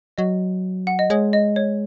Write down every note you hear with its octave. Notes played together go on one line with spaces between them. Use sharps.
F#3 D#5
F#5
D#5
G#3 C#5
D#5
C#5